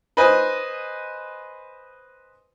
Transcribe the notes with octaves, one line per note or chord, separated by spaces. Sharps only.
B4 C5 D#5 G#5